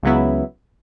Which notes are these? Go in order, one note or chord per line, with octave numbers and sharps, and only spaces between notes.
C#2 C#3 F#3 B3 E4